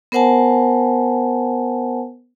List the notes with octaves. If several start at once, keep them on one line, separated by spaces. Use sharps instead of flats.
B3 A#4 C5 F#5 G#5 A5